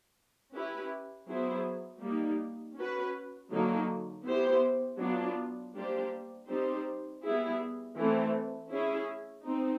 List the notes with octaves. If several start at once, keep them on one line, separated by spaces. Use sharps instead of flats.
C#4 E4 G4 B4
F#3 B3 E4 G#4 C5
G3 A#3 D#4
C#4 F#4 B4
D3 F#3 A#3 D#4
B3 E4 G4 C5
F#3 B3 D4 F4
G3 A#3 D4 G4 C5
G3 C4 D#4 G4 C5
G3 B3 E4 G#4
E3 A3 C4
C#4 E4 G#4
C4 D#4